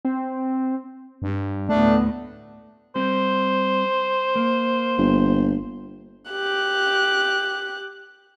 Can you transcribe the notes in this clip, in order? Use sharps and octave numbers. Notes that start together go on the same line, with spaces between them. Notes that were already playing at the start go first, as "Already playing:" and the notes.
C4
G2
D2 A2 A3 B3 D4
G3 C4 C5
A#3
G1
G4 F#6